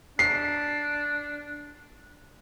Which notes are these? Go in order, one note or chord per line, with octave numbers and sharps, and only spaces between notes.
D4 C7